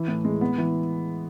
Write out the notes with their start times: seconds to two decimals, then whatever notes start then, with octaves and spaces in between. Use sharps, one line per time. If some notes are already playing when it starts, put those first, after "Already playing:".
Already playing: E3
0.08 A2
0.25 G#3
0.41 B3
0.58 E3